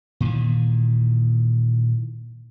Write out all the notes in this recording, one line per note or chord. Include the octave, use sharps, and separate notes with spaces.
A#2 D#3 E3